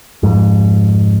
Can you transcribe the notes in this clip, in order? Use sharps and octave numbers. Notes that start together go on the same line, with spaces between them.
F2 G#2